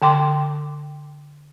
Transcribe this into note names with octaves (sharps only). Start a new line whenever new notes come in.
D3 G5 C6 D6